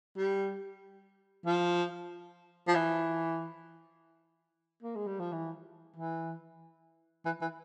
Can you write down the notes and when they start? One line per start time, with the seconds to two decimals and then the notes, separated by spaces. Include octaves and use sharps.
0.17 G3
1.46 F3
2.68 F3
2.75 E3
4.83 A#3
4.95 G#3
5.07 G3
5.20 F3
5.32 E3
5.97 E3
7.25 E3
7.41 E3